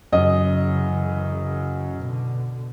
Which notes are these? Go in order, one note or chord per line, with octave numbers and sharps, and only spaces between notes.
F#2 C#3 E3 D#5
B2 D3